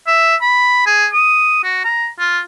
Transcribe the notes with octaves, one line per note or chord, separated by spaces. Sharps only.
E5
B5
G#4
D#6
F#4
A#5
F4